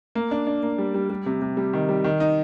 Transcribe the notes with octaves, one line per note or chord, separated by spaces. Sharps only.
A#3
D4
D4
A#3
G3
G3
G3
C3
C3
G3
D#3
G3
D#3
D#4